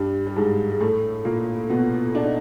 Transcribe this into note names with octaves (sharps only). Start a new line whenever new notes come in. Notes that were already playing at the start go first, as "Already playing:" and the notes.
Already playing: G2 G3
G3
G#2 G#3
G#3
A2 A3
A#2 A#3
B2 B3
D4
D#4